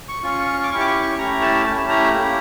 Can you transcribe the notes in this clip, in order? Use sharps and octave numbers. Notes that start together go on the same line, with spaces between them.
C#6
C#4 F4 C#6
D6
C#4 E4 G4 C#6
D6
C#6
C#6
A3 C#4 E4 G4 A#5
A5
A3 C#4 E4 G4 A5
A#5
A#3 C#4 E4 G4